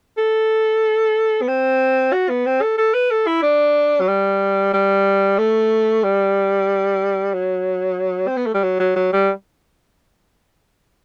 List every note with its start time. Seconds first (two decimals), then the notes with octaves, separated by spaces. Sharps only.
0.18 A4
1.42 B3
1.48 C4
2.13 F#4
2.30 B3
2.46 C4
2.62 A4
2.78 A4
2.94 B4
3.11 A4
3.27 E4
3.43 D4
4.01 F#3
4.08 G3
4.73 G3
5.38 A3
6.04 G3
7.34 F#3
8.27 C4
8.37 B3
8.46 A3
8.55 G3
8.64 F#3
8.80 F#3
8.96 F#3
9.13 G3